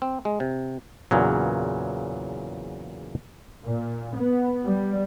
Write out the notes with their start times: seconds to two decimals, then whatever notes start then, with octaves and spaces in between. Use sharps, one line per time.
0.02 C4
0.25 G#3
0.40 C3
1.11 E2 A#2 C#3 F#3
3.66 A#2
4.17 B3
4.66 G3